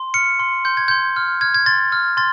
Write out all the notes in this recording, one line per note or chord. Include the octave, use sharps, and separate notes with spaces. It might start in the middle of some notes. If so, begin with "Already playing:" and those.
Already playing: C6
F6 C#7
C6
C6 G6
G#6
C6 G6
F6
F6 G#6
G#6
C6 A6
F6
C6 A6